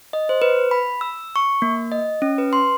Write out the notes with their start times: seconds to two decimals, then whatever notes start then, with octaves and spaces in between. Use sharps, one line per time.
0.13 D#5
0.29 C5
0.42 B4
0.71 B5
1.01 E6
1.36 C#6
1.62 A#3
1.92 D#5
2.22 C#4
2.38 B4
2.53 C6